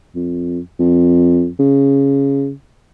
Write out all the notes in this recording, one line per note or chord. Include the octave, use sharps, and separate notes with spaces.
F2
F2
C#3